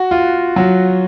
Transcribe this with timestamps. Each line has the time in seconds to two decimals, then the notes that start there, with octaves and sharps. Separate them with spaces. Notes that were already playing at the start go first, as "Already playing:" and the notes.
Already playing: F#4
0.11 F4
0.56 F#3